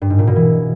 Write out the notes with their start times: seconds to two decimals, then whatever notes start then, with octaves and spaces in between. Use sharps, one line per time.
0.02 G2
0.10 G#2
0.19 A#2
0.27 B2
0.36 E3